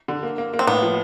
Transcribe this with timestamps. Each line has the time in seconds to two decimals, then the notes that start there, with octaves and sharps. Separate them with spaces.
0.08 D3
0.23 A#3
0.38 A#3
0.53 A#3
0.59 C4
0.67 A2 B3
0.82 F3